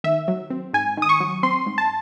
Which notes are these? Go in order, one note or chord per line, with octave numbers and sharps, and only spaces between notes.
D#3 E5
F#3
C4
G#2 G#5
D#3 D#6
C#6
F#3
C4 C6
G#2
A5